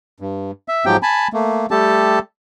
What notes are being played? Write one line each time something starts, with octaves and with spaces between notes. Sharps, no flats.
G2
E5
G#2 F3 F#3 G4 G5
G#5 A5 B5
A3 A#3
G3 A3 G4 A4 A5